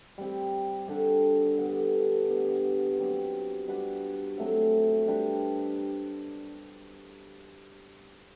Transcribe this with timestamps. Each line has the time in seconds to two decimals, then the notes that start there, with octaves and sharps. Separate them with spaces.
0.18 G3 C4 G4
0.88 D3 G3 D4 G4
1.58 D3 G3 B3
2.28 G3 B3 D4
2.99 F#3 C4 G4
3.68 G3 D4 F#4 B4
4.38 F#3 A3 C4
5.08 G3 D4 G4 B4